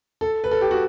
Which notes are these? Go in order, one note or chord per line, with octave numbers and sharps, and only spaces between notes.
A4
B4
A4
G4
F#4